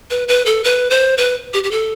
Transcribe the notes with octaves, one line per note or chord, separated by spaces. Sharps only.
B4
B4
A4
B4
C5
B4
G4
G4
A4